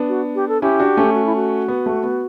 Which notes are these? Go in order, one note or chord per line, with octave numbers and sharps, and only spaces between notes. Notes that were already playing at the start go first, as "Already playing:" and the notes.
Already playing: B3 D4
F#4
G4
A4
C#4 E4 G4
D4 F#4
A3 C#4
F#4
E4
F#4
B3
A3
B3